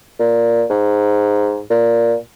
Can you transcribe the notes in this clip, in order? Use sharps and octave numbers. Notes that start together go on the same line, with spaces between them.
A#2
G#2
A#2